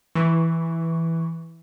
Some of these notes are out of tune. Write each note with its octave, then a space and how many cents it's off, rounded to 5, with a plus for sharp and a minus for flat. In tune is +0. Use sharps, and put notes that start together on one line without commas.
E3 +0 C#6 +0